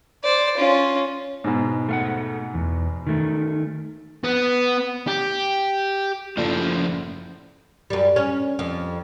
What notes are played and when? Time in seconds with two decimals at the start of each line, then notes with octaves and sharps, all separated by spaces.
0.23 C5 D5
0.57 C#4 F4
1.44 G#2 B2
1.89 A3 F5 F#5
2.54 E2
3.07 D#3 A3
4.24 B3
5.08 G4
6.37 F#1 A2 F3 A4 D5
7.90 F#2 G3
8.16 C#4
8.59 F2